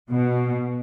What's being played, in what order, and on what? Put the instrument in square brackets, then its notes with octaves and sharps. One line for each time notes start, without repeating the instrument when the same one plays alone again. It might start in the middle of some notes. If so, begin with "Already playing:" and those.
[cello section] B2